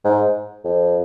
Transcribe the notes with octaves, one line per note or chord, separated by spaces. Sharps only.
G#2
F2